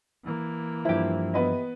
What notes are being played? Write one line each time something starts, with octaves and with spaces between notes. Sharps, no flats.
E3 A#3
G2 F3 E4 G4
B3 B4 D#5